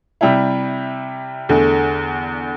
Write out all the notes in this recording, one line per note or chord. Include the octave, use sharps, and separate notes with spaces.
C3 G3 E4
E2 D3 A3